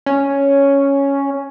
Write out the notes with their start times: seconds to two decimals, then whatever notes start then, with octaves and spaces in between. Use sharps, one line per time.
0.06 C#4